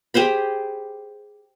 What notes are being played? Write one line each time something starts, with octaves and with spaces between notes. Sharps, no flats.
G4 G#4 C5 B5